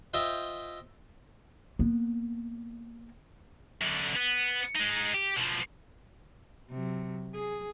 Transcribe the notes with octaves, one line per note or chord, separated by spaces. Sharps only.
F4 C5 D#5 E5 G5
A#3 B3
F#2 D3
B3
G#3 D#4
G4
B2 F3
C3 F#3
G#4